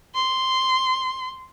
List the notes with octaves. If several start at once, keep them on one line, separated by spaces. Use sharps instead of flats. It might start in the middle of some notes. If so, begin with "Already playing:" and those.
C6